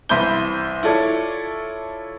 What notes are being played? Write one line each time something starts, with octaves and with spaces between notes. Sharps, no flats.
C2 E3 C5 B5 G6 G7
E4 F4 A4 C#5 D5